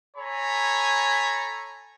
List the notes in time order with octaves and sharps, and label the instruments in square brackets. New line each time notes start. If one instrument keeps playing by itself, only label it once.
[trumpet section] A4 C#5 G#5 A#5 B5